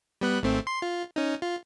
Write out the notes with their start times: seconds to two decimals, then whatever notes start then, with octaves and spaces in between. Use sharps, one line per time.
0.21 G3 B3 F#6
0.43 G#1 A3 C4
0.67 C6
0.82 F4
1.16 C#4 D#4
1.42 F4